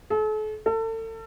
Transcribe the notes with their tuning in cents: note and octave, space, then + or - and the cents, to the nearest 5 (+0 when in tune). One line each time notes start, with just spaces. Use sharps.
A4 -40
A4 +35